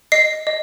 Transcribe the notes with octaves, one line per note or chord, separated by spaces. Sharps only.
D#5 C7
D#5